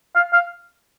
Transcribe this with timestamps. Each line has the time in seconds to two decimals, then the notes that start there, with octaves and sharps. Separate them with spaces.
0.15 F5
0.33 F5